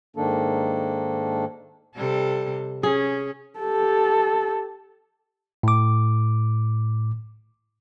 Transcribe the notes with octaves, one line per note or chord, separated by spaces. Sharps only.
G#2 D#3 A#3 D4 A4
C3 G3 A4
C#4 G#4
G4 A4
A2 D6